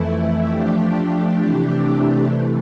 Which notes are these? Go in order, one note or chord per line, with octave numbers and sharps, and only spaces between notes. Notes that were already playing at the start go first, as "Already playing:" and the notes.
Already playing: F2 E3 A3 E4
F3 A3 D4 G4
C3 E3 A3 D4 G4
C3 E3 A3